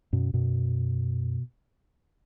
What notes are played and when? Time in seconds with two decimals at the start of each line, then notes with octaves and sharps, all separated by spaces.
0.13 F#2 B2
0.33 F#2 B2